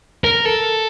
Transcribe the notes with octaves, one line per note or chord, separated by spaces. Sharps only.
A#4
A4